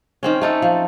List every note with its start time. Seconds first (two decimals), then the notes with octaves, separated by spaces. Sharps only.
0.23 D#3 C4 C#4
0.41 A3 D#4 A4
0.62 F3